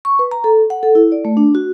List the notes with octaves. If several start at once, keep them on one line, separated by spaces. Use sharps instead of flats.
C#6
B4
A#5
A4
F#5
A4
E4
D5
A3
D4
F#4